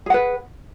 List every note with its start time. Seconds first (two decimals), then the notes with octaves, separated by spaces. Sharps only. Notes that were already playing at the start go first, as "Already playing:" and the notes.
0.06 G#4
0.10 F#5
0.14 B4